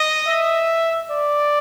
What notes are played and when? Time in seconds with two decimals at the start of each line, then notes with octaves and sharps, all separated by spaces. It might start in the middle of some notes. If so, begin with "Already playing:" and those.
Already playing: D#5
0.27 E5
1.10 D5